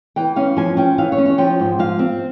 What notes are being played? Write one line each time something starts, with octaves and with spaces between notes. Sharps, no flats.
E3 G5
C#4 F5
F3 G#5
C#4 G5
E3 F5
C#5
C#4
C#5
F3 G5
G#2
F3 F5
C4